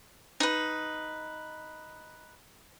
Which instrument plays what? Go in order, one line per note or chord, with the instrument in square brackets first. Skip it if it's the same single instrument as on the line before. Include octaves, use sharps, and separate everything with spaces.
[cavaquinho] D#4 B4